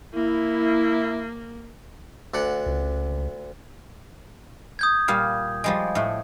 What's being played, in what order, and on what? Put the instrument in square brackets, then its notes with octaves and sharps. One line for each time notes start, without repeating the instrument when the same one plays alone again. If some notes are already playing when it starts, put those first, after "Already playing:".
[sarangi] A#3 [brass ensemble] E4
[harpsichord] D2 D4 F#5
[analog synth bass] C#2
[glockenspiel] D#6 G6 G#6
[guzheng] A#2 G3 F5
F3 G3 G#3
A2 A3